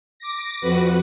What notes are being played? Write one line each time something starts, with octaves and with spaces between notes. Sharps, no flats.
D6 A#6
F2 F#4 B4